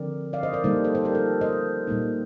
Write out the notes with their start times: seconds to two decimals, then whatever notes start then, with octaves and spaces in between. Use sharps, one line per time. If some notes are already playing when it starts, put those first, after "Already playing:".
Already playing: D3 F3 C4 A#4 D5
0.33 D5 F5
0.43 C5 D#5
0.53 A#4 D5
0.64 D#3 G3 A#3 D#4 A4 C5
0.84 A4 C5
0.95 A4 C5
1.05 G4 A#4
1.15 F4 A4
1.41 C5 D#5
1.87 A#2 G3 A#3 D#4